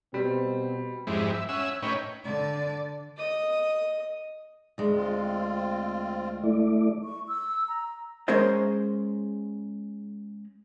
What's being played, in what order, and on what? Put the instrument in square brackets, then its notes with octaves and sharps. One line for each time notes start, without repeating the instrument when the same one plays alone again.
[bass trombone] B2 [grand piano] G3 [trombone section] C4
[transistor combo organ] F2 G#2 G3 G#3 C4 E4
E5
C#4 E5 F#5 G#5 E6
A2 C#4 D#4 B4 C#5 G5
[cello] D3 D5
[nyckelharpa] D#5 D#6
[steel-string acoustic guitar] D2 G#3
[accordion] C4 F4
[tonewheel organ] A3 E4 D5
[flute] C#6
E6
A#5
[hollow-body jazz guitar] G#3 C#4 G#4 A#4 C5 D#5